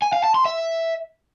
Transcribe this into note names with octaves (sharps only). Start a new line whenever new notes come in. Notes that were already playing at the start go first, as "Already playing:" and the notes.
G#5
F5
A5
C6
E5